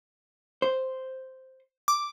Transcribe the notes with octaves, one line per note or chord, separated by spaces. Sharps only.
C5
D6